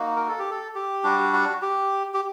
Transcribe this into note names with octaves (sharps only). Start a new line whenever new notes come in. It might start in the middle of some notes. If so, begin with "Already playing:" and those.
Already playing: A#3 D#4 F#4
A#4
A4
G4
A4
G4
G3 D4 F#4
F#4
G4
G4